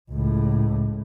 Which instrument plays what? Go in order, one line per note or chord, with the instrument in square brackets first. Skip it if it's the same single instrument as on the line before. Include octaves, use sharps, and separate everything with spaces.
[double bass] C#2 A2